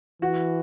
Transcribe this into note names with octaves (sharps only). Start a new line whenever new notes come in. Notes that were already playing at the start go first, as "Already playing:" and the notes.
E3 F#4